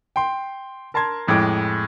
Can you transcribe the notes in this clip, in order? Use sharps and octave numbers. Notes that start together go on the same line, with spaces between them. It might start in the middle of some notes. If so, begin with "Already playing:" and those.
G5 C6
A#4 A5 A#5 C6 G#6
F2 A2 G#3 G5 D6